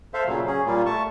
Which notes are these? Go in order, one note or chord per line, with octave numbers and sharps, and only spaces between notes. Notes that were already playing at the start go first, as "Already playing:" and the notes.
A4 C5 E5 F5
A#2 C#3 F#3
C#4 G#4
A#2 G3 A#3 F4
A3 A5 C#6